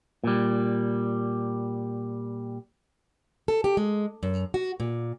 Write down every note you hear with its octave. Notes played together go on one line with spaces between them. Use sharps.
A#2 G3
A4
G4
G#3
F#2
F#4
A#2